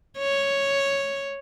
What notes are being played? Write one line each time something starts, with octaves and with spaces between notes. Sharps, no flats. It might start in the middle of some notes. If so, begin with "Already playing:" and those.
C#5